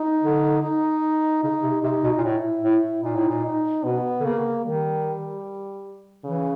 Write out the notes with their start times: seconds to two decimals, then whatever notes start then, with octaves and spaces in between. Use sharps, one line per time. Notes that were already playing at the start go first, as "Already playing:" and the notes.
Already playing: D#4
0.23 D3
0.63 D#4
1.44 C#3 D#4
1.63 C3
1.83 C3 D#4
2.04 B2
2.18 A#2
2.24 A2 E4
2.64 A2
3.04 A#2 D#4
3.16 A2
3.28 A#2
3.45 D#4
3.85 B2 B3
4.20 D3
4.25 C#3 A#3
4.65 D#3 G3
6.25 C#3 E3